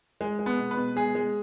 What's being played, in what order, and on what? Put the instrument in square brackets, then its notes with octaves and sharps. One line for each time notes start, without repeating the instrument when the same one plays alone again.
[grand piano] G#3
G#3
B3
B2
B4
B2
G#3 G#4
G#3